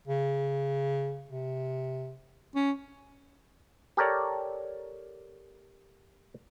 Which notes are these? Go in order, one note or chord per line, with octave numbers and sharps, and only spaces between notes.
C#3
C3
C#4
G4 A4 A#4 C#5 D5